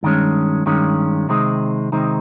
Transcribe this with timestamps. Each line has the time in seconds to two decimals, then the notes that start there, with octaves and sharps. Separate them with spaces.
0.03 G2 D#3 G#3 C#4
0.66 G2 D#3 G#3 C#4
1.29 C3 D#3 G#3 C4 D#4
1.92 C3 D#3 G#3 C4 D#4